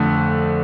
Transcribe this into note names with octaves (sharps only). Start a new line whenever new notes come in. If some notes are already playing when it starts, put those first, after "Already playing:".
Already playing: F2 D3 A3